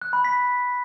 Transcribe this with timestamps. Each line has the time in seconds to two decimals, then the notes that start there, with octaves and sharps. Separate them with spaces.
0.02 F#6
0.13 B5
0.25 B6